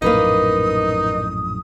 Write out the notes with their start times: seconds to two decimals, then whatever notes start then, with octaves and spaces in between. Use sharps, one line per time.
0.02 A#1 F#2 A2 A#3 D#4 B4 D#5 D#6